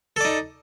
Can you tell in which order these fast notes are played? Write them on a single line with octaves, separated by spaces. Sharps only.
A4 D5 D#4